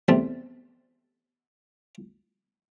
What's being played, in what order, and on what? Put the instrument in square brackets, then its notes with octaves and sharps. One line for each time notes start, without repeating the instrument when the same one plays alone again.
[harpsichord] E2 C3 A3 C4 A5